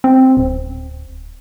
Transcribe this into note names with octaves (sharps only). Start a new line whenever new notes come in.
C4
D1